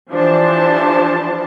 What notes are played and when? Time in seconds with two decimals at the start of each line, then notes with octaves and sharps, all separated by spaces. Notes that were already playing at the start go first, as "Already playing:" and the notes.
0.12 E3 F3 D4 G4 C5 A5